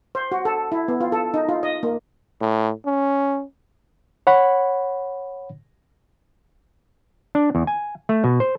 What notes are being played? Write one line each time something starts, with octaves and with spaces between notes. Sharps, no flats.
C5
F#4
A4
E4
B3
F4
A4
D#4
F4
D#5
A#3
A2
C#4
C#5 F#5 B5
D4
E2
G#5
A3
B2
C5